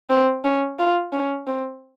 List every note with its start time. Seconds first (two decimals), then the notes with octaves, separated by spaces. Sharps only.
0.10 C4
0.45 C#4
0.79 F4
1.13 C#4
1.47 C4